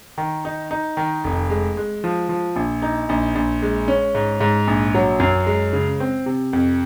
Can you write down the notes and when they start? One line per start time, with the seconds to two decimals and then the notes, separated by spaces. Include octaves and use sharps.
0.18 D#3
0.45 D#4
0.71 D#4
0.97 D#3
1.24 F1
1.50 G#3
1.77 G#3
2.04 F3
2.29 F3
2.56 A#1
2.82 D#4
3.09 A#1
3.35 A#1
3.62 G#3
3.88 C#4
4.15 G#2
4.40 G#2
4.67 A#1
4.94 F#3
5.20 F#2
5.47 G#3
5.73 C#3
6.00 C4
6.26 C3
6.53 F2